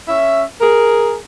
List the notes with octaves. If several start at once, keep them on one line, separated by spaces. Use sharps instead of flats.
C#4 E5
G#4 A#4